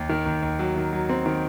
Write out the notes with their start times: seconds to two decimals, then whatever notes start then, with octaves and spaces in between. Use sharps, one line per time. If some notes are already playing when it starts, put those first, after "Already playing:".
Already playing: D#2
0.09 D#3
0.26 D#2
0.42 D#2
0.59 F#3
0.76 D#3
0.93 F#3
1.09 C4
1.26 D#3